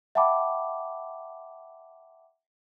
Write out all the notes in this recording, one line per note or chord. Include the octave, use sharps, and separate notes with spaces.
E5 F#5 G5 A5 B5 D6